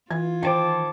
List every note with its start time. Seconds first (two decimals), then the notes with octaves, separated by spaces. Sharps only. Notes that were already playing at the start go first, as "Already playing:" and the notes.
0.11 E3 F4 G#6
0.43 D#3 C5 G5 A5 D6